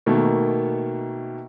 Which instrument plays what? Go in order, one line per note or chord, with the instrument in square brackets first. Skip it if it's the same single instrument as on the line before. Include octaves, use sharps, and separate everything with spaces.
[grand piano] B2 D#3 A3 A#3